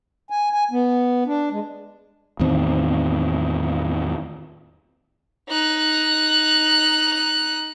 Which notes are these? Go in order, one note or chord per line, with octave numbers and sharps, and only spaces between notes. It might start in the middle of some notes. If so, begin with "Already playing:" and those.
G#5
G#5
B3
D4
G#3
E2 A2 D#3 C4
D#4 F#6